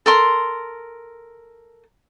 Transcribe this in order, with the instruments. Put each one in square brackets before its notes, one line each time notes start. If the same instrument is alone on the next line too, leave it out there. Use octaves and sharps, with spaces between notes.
[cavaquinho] A4 A#4 C6